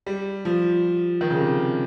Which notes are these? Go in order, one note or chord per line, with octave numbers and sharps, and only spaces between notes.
G3
F3
D#3
C#3
C3